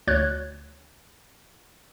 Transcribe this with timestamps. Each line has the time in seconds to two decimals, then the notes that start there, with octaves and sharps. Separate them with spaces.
0.07 D2 C#5 F#6 G#6